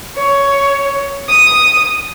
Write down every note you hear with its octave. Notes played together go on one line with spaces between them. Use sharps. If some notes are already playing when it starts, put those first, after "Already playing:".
C#5
D#6